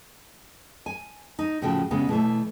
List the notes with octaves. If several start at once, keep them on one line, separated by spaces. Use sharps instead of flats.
G#5
D#4
A2 C#3 F3 F#4 G5
C#3 G3 G#3 B3
B2 E3 A3